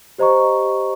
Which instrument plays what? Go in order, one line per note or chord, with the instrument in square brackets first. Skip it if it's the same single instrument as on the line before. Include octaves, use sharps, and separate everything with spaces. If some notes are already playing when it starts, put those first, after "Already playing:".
[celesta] G4 C5 D#5 A#5 C#6